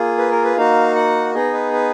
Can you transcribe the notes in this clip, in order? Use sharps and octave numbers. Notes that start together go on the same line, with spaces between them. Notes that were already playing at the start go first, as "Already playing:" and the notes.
Already playing: A#3 F4 G#4
B4
A#4
B4
A#3 D#4 F#4 F5
F#5
B3 D#4 G#4 D#5
B4
B4